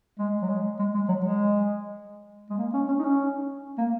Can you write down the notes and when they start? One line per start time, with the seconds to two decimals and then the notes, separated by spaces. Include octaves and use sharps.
0.19 G#3
0.42 F#3
0.50 G#3
0.79 G#3
0.94 G#3
1.09 F#3
1.24 G#3
2.50 G#3
2.58 A#3
2.74 C#4
2.88 C#4
2.99 D#4
3.04 C#4
3.78 A#3